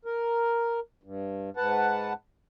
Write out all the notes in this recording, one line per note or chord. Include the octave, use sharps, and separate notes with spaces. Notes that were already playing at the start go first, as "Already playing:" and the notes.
A#4
G2
G#2 B4 F#5 A5